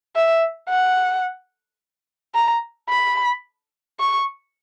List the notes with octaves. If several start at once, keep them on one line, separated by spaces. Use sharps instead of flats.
E5
F#5
A#5
B5
C#6